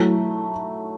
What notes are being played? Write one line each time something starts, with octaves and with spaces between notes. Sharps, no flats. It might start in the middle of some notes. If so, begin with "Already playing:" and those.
Already playing: F#3 A3 E4